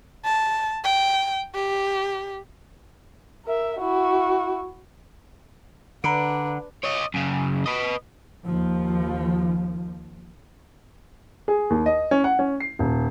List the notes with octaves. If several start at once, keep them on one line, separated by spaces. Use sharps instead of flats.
A5
G5
G4
A#4 E5
E4 F#4
D3 D4 B4 F#5 A#5 B5 D7
C#5 D#5
F#2 C#3
B4 D#5
D#2 F3
G#4
D#2
D#5
C#4
F#5
C#4
C7
D#1